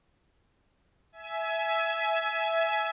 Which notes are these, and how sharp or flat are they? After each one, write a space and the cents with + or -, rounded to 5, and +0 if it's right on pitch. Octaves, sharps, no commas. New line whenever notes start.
E5 +0 G#5 +25